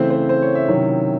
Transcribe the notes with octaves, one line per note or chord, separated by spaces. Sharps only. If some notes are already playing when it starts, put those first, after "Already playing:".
Already playing: C#3 E3 A3 C4 C5
C5
C5
C#5
E5
C3 D#3 F#3 C#4 E4